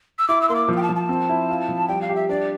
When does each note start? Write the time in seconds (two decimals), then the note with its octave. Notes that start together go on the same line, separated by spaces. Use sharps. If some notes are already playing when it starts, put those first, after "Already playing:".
0.19 E6
0.28 E4 D6
0.42 E6
0.49 A#3 C6
0.55 D6
0.68 F3
0.77 G5
0.83 A5
0.89 F3
0.96 A5
1.09 C4
1.29 E4
1.49 F4
1.68 F3
1.88 G3 G5
2.02 F5
2.09 G4
2.16 E5
2.29 D4 D5